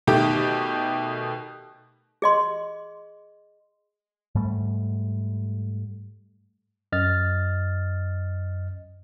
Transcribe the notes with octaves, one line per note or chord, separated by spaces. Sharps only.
B2 D#3 A3 G4
G#4 D#5 C6
G#2 G3 A3
F#2 D#5 F6 A6